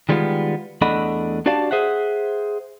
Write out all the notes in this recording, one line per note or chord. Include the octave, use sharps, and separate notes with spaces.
D#3 G3 G#3 B3 F4
E2 A3 D4 D#5 F#5 B5
D4 F#4 G4 D5 F5 A5
G#4 C5 E5 F#5